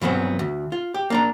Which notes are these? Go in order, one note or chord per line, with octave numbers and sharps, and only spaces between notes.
G2 E3 F#3 B3 C4
D2
F4
G4
A#3 D4 A#5